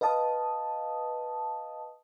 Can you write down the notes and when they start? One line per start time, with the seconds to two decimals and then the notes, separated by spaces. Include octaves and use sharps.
0.01 B4 D#5 F5 A5 D#6